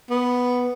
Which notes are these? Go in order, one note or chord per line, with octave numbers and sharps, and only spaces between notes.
B3